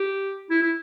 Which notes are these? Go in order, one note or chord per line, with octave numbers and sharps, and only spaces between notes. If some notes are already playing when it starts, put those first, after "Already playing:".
Already playing: G4
E4
E4